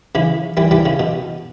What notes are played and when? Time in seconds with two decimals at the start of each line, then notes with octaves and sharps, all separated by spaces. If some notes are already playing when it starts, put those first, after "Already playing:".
0.15 C#3 E3
0.57 E3 G3
0.71 E3 G3
0.85 C#3
0.99 B2